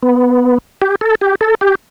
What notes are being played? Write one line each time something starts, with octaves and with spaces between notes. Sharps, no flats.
B3
G4
A4
G4
A4
G4